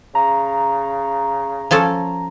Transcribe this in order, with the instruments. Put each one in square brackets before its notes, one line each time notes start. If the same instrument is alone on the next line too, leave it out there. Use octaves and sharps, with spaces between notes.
[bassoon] C#3 [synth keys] A#5
[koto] F3 C#4 A4